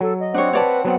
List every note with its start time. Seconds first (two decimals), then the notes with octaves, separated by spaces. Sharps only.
0.01 F#3 A4
0.20 D#5
0.34 C4 D4 C5 C#5 F#5
0.53 B4 C#5 D5 A5
0.85 F#3 B3 C4 F#5